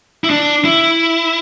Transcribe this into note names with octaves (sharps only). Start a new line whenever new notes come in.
E4
D4
E4